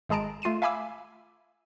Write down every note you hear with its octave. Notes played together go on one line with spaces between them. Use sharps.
G#1 G#3 G#4 A5 A#5 D7
A3 F4 C7 D#7 E7
E5 F5 G#5 B5 D6 E6